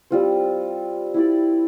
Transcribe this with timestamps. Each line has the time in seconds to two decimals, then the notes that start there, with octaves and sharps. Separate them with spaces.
0.11 G3 C4 F4 C5
1.14 E4 G4 D5